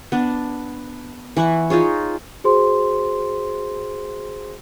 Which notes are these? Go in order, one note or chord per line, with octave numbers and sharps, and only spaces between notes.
B3 D4
E3 E4 F#5 C#6
D#4 F4 G#4 C#5
F#4 G#4 C5 C6